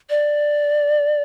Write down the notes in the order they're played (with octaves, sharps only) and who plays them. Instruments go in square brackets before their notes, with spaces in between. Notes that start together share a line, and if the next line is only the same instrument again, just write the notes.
[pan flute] D5